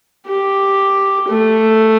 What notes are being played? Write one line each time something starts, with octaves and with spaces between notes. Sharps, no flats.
G4
A3